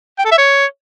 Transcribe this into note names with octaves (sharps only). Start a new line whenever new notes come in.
G5
A4
E5
C#5